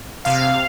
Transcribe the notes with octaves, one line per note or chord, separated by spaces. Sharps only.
C3 F5